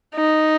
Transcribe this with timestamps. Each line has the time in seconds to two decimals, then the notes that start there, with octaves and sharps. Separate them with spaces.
0.15 D#4